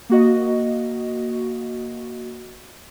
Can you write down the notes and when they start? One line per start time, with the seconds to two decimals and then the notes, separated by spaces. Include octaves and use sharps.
0.10 A#3 F#4 D#5